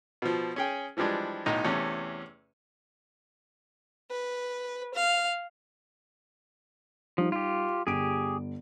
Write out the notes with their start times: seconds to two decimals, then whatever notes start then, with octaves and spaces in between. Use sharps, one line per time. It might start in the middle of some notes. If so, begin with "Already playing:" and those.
0.22 B2 F3
0.56 C#4 G#4 G5
0.97 E3 F3 G3 G#3 D4
1.46 B1 A2 D#4 D#5
1.65 E2 C3 A3 C#4
4.10 B4
4.94 F5
7.18 F3 G3 D#4
7.32 F4 G4
7.87 G1 G4 G#4 D7